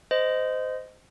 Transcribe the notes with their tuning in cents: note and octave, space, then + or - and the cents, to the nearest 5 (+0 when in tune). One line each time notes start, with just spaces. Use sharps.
C5 -20 D#5 +0